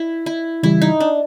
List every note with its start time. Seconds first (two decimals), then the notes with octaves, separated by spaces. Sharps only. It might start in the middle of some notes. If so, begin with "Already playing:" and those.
Already playing: E4
0.26 E4
0.63 C#3 E3 G3 E4
0.82 D#4
1.00 D4